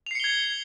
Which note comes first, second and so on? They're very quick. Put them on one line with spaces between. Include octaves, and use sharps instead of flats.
F7 C7 C#7 G7 G#6